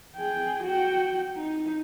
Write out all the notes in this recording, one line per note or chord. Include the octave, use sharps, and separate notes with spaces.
G#4 G5
F#4 G5
D#4